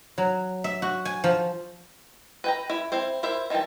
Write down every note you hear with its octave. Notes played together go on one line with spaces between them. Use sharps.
F#3
E5
F#4
G#5
F3
B4 G5 A#5
E4 B5
C4 E4 C5
E4 A#4 C5 E5
D#3 E3 G3 G5 A5